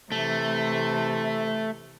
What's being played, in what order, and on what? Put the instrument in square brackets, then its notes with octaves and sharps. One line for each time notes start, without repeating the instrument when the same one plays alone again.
[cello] C3 E3 [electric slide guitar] A3